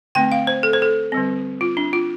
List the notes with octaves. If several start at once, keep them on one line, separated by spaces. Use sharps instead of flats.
D3 A3 C4 G5
F5
C5
A4
C5
A4
D3 G3 C4
F4
D4
F4